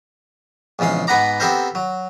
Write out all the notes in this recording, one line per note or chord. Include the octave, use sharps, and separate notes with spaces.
A#1 E2 C#3 G#3 F5
G#2 B3 B4 F#5 A#5 D6
B3 C4 G4 A4 A#4 C5
F#3